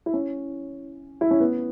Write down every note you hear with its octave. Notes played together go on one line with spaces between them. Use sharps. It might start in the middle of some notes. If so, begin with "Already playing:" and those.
E4
C#4
E4
C#4
B3